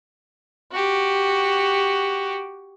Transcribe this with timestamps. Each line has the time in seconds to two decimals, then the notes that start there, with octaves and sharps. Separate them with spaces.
0.71 F#4 G4